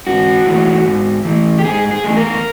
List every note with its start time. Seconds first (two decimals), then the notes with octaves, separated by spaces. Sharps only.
0.07 G#2 F#4
0.46 E3 A3
0.86 G#2
1.25 E3 A3
1.59 G4
1.64 G#2 G#4
1.91 G#4
2.04 E3 A3
2.16 A#4